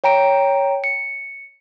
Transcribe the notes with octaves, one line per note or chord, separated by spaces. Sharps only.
C#5 G5 A#5 D7
C#7